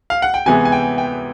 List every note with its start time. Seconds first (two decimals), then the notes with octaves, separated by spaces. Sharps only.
0.10 F5
0.22 F#5
0.34 G5
0.46 C3 E3 G#3 B3 G#5
0.65 G#5
0.72 G5
0.98 G5